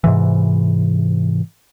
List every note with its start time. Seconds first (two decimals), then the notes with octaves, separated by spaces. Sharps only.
0.04 G#2 C3 E3